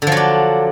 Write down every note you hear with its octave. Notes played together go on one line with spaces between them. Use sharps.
D3 F3 F#3 D4